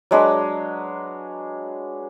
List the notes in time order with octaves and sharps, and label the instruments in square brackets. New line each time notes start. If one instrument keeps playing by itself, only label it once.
[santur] F#3 G#3 D4 B4